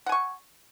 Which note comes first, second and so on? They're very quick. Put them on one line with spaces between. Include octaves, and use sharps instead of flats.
F#5 G#5 C#6